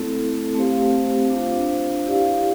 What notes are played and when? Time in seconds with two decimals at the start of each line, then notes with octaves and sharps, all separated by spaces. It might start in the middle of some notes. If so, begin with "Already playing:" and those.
Already playing: A3 C4 E4 A4
0.55 A3 C4 G4 C5 F5
1.30 D4 F4 C5 F5
2.06 E4 G4 D5 F5